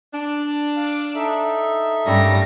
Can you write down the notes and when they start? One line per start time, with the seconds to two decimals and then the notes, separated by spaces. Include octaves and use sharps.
0.14 D4
0.76 F5
1.15 D#4 A4 E5
2.06 G2 G3 A3 A#3 C#4 A#6